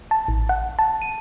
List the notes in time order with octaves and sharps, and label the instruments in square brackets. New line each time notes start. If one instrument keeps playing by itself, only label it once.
[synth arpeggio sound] A5
A1
F#5
A5
D#7